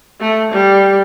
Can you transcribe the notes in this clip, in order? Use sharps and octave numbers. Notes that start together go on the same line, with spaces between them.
A3
G3